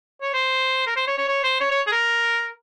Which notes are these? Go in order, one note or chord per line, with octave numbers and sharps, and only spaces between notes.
C#5
C5
A#4
C5
C#5
C#5
C#5
C5
C#5
C#5
G#4
A#4